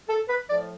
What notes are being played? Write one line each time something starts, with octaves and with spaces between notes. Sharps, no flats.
A4
B4
A2 F3 D5